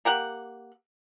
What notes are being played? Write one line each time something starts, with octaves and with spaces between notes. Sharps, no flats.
A#3 G4 F#5